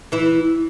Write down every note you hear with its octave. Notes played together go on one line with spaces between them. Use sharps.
E3 E4